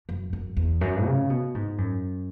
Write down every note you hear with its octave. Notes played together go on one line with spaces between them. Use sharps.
F#2
F#2
E2
F#2
C#3
B2
G#2
F#2